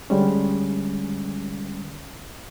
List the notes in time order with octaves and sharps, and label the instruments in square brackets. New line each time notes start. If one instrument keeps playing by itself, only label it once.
[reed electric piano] D3 G3 G#3 C#4